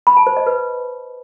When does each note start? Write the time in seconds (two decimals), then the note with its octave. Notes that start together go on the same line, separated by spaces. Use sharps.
0.07 B5
0.17 A5
0.27 C5
0.37 D#5
0.46 B4